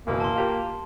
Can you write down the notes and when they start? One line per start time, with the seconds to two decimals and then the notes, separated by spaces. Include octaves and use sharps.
0.07 F#1 B2 E3 A#3
0.20 A5 C6
0.36 F4 G4 A#4